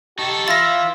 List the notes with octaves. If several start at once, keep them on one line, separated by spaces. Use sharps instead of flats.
D#4 G4 A4 A5 C#6
E3 F4 E5 F5 A6 A#6